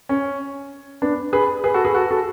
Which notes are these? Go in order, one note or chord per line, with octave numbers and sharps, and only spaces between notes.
C#4
B3 D4
G#4 B4
G#4 B4
F#4 A4
G#4 B4
F#4 A4
F#4 A4